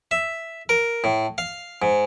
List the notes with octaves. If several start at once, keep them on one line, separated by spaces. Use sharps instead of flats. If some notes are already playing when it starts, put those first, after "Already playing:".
E5
A#4
A2
F5
G#2